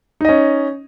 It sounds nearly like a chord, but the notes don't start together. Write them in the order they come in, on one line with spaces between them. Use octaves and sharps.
D#4 D#5 C#4